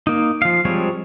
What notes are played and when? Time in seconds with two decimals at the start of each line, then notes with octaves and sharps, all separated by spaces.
0.07 A#3 D#4
0.42 F3 F5
0.65 F3 G3 G#3 C4 C#5